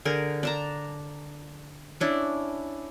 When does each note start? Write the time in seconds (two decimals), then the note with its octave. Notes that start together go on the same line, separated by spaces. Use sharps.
0.05 D3 G#4 A#4
0.43 D4 A5 A#5
2.00 C#4 D4 E4